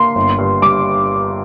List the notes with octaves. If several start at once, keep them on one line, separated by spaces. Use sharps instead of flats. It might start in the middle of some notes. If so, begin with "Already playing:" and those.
Already playing: A#3 C6
G1
G2
G3 D6